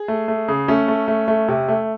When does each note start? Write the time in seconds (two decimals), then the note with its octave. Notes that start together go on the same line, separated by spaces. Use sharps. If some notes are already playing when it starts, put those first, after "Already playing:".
Already playing: G#4
0.08 A3
0.28 A3
0.48 C#3
0.68 A3 C#4
0.88 A3
1.08 A3
1.28 A3
1.48 C3
1.68 A3